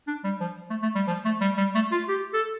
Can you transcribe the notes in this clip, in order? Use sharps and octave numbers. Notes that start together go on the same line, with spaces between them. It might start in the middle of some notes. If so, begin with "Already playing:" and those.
D4
G3
F3
A3
A3
G3
F3
A3
G3
G3
A3
F4
G4
A4